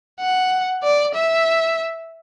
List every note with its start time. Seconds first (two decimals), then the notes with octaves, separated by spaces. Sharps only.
0.20 F#5
0.83 D5
1.15 E5